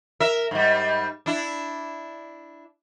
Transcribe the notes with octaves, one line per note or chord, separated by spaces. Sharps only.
A#4 E5
G#2 G3
D4 E4